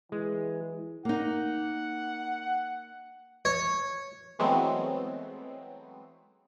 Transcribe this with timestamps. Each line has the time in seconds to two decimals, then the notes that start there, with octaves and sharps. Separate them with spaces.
0.12 E3 G#3
1.05 A#3 D#4 F#5
3.45 C#5
4.39 E3 F#3 G#3 A3 B3 C4